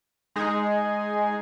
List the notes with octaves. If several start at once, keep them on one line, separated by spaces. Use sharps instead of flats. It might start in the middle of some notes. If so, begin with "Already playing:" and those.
G#3 D#4 G#4